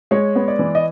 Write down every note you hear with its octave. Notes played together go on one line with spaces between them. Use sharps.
G#3 C#5
B3
D5
E3
D#5